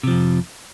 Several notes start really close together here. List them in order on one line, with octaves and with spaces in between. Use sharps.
C3 F3 F2